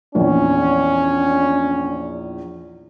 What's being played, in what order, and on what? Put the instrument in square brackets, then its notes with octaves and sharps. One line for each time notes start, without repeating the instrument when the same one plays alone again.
[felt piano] A#1 E2 [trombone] C#4